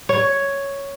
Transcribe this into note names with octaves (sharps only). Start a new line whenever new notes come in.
C#5